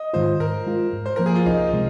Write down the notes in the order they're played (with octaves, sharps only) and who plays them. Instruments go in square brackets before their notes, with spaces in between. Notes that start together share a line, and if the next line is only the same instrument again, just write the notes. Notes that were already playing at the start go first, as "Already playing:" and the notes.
Already playing: [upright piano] D#5
[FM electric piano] G#2 D#3 G#3 F4 [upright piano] C5
[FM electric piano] G#2 [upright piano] A#4
[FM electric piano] G#3 F4
G#2
[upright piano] C5
[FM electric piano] F3 A#3 [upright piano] A#4
[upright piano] G#4
F4
[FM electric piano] C2 [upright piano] D#4
[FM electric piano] C3 G#3